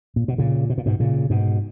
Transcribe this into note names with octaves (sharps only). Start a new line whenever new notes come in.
A#2
B2
A#2 C#3
B2
A#2
G#2 B2
A#2 C#3
G#2 B2